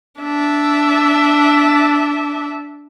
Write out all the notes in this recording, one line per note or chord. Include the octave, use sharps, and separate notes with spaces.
D4 E5